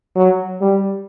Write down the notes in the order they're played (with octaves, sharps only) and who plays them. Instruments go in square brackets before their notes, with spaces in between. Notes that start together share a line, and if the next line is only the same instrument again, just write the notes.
[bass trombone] F#3
G3